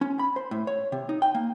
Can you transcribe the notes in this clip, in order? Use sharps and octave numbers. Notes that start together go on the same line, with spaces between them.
C#4
B5
C5
A2
C#5
C3
D#4
G5
A#3